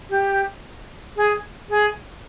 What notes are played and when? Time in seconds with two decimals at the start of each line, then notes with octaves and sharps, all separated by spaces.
0.10 G4
1.16 G#4
1.70 G#4